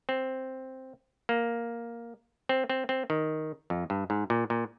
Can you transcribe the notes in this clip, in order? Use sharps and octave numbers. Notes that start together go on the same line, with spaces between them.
C4
A#3
C4
C4
C4
D#3
F2
G2
G#2
A#2
A#2